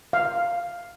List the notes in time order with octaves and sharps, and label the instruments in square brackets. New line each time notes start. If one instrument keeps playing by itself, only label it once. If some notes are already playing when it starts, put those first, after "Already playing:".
[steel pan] F5